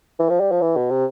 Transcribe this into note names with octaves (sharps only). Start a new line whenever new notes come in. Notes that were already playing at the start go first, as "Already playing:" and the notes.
E3
F3
G3
F3
E3
B2
C3